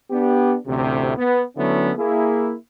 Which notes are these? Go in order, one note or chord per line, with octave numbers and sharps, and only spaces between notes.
B3 D4 G4
A1 D2 A2 C3
B3
D3 F#3 A3 B3 C#4 E4
A#3 E4 G#4